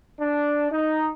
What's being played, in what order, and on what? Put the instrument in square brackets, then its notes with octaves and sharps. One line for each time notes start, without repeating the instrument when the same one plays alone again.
[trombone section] D4
D#4